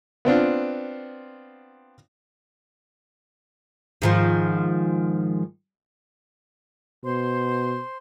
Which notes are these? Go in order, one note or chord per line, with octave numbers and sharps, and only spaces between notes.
B3 C4 D4 F4
G#2 D#3 F3
B2 C5 C6